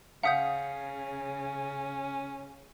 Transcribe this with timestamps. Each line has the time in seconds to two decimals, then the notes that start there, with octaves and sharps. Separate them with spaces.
0.23 C#3 C#4 F5 F#5 D#6 G6 B6 C#7